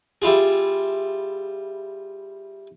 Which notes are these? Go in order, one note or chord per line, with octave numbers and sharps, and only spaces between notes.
G3 E4 F4 G#4